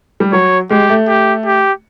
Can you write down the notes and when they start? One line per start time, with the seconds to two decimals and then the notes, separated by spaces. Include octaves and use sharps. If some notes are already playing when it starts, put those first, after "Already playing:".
0.20 G3
0.33 F#3 C#5
0.70 G#3 G4
0.89 A3
1.07 G4
1.46 G4